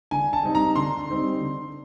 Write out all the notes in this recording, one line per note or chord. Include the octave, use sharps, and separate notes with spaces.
D3 G#5
A5
G3 C4 D#4
A#5
D3 C6
G3 C4 D#4
D3